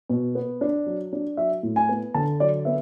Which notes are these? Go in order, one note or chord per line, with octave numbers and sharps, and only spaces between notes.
B2
B3
D4
F#3
D4
F#3 E5
A2
G#5
B3
D3 A5
F#3 D5
B3 E5